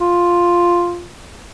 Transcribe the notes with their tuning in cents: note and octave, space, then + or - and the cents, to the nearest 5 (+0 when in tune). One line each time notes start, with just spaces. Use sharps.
F4 +0